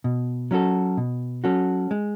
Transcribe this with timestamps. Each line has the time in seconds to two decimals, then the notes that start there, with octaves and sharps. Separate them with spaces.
0.04 B2
0.51 F#3 C#4 F#4 A4
0.97 B2
1.44 F#3 C#4 F#4 A4
1.91 G#3